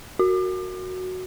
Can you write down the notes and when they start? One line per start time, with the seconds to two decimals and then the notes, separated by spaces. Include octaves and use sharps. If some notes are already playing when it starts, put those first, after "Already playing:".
0.19 F#4